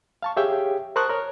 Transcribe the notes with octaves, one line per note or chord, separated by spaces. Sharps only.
F5 A5 C#6
G4 G#4 C#5 E5 F5 G5
A#4 C5 A5 C#6 D#6 F#6
A#4 C#5